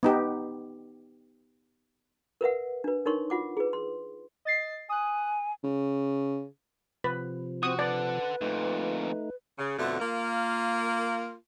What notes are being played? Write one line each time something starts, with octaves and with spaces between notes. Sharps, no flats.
B3 D#4 G4
A#4 B4 E5 F#5
D4 B4
D4 D#4 A#4 C#5 C6 C#6
F4 F#5 D6
G#4 B4
C6
D#5 A6 C7
G#5 D#6 F#6
C#3
C3 F3 B4
C4 F#4 D#6
A4 B4 D5 F#5
F2 A#2 A3 D#4
C#3
F2 B2 D3 A3
A#3 F4